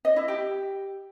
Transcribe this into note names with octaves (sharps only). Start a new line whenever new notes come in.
D#5
E4
G4